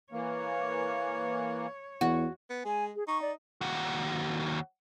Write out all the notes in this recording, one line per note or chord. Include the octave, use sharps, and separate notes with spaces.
E3 A#3 C#5
E2 F#4
B3
G#3 G#5
G#4
D#4 C#6
D5
D#2 F#4